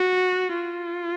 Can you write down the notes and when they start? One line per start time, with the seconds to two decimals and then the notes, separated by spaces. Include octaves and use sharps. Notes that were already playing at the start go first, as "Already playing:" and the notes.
Already playing: F#4
0.53 F4